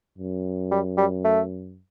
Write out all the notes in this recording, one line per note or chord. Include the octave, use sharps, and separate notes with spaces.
F#2
G3
G3
A3